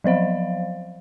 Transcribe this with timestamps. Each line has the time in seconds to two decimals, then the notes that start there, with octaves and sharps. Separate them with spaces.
0.04 F3 F#3 C5 F5